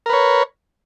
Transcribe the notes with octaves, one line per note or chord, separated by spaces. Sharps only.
A#4 B4 C#5